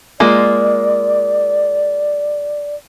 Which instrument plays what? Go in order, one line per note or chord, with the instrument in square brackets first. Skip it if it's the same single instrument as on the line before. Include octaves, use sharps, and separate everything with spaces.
[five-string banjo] G#3 A#3 F4 [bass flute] D5